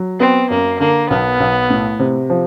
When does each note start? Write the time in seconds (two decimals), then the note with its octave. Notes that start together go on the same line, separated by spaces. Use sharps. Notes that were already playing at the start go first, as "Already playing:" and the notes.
Already playing: F#3
0.20 B3 C4
0.50 F#2 A#3
0.80 D3 A#3
1.10 B1 B3
1.40 B1
1.70 A2
1.99 C3
2.30 F3